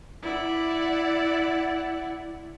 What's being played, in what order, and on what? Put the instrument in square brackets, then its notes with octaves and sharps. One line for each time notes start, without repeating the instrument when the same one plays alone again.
[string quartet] E4 D5 F#5